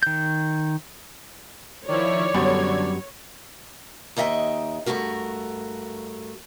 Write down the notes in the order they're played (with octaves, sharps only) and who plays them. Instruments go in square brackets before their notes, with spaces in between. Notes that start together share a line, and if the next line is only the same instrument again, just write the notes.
[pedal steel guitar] D#3 G6
[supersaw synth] D#3 F3 E4 [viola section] C#5 [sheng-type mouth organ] D5
[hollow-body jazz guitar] F#2 G3 B3 [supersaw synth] D3 G#6
[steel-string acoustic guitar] D#2 D#4 D#5 E5 G5
G2 A#2 A3 F#4 A#4